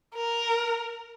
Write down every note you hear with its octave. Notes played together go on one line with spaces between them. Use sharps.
A#4